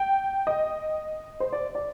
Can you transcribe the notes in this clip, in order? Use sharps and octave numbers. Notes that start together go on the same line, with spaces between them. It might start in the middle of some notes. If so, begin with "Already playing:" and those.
Already playing: G5
D#5
C5
D5
D5